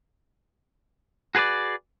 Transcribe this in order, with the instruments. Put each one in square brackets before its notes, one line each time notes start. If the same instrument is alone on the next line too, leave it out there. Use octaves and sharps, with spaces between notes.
[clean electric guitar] F#4 G#4 B4 C5 D5